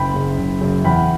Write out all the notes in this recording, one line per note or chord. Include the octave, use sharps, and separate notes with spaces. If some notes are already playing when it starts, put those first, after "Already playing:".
Already playing: F#1 G5 B5
F#2 C#3
F#1
F#2 C#3
E2 G5 B5